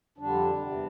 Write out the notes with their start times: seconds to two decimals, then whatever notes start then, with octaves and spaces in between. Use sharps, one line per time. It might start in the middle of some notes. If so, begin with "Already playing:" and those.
0.18 F2 D3 G3 D4
0.59 E2 C3 G3